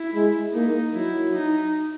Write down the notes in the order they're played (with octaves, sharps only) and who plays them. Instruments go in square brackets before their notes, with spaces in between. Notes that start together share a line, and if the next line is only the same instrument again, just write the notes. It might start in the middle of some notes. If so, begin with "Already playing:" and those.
Already playing: [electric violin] E4
[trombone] G#3
[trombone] A#3 [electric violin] D#4
[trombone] F#3 [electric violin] E4
[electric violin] D#4